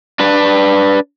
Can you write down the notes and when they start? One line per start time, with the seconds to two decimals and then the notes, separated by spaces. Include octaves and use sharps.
0.19 D4 B4